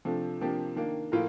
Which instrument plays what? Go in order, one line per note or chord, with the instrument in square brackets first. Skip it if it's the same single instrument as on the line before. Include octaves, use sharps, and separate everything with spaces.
[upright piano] C3 F3 A3 D4
C3 F3 A#3 D4 G4
D#3 A#3 D4
A2 F3 A#3 F4 A#4